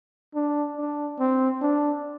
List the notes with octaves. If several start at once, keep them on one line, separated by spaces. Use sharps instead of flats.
D4
D4
C4
D4